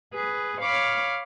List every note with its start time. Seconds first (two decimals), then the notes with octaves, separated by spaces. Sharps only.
0.14 G#4 B4
0.61 C#5 F5 B5 D6 F6